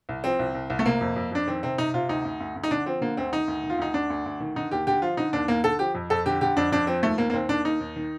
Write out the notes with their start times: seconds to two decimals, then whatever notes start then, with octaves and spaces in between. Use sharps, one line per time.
0.09 C2
0.24 F3 C4
0.39 C2
0.54 C2
0.70 C2
0.79 A3
0.85 C3 A#3
1.01 F2
1.16 F2
1.32 F2 D4
1.47 D#3 C4
1.63 C3 C4
1.78 C3 D#4
1.94 C3 F4
2.09 D2 D#4
2.25 D2
2.40 D2
2.56 D2
2.63 D#4
2.71 D3 D4
2.86 F3 C4
3.01 D3 A#3
3.17 D2 C4
3.33 D#3 D#4
3.48 D2
3.63 D#3
3.70 F4
3.79 D2 D#4
3.94 D2 D4
4.10 D2
4.26 D2
4.40 D#3
4.56 D3 D#4
4.71 D#2 G4
4.87 D3 G4
5.02 F3 F4
5.17 D3 D#4
5.33 D#2 D4
5.48 D#2 A#3
5.64 D3 A4
5.79 F3 G4
5.95 F2
6.10 F2 A4
6.26 D3 G4
6.41 D3 G4
6.56 F2 D4
6.72 F2 D4
6.87 F3 C4
7.03 D#2 A3
7.18 D#2 A#3
7.30 A#3
7.34 D#2 C4
7.49 D#2 D4
7.65 D#2 D#4
7.80 D#2
7.96 D#3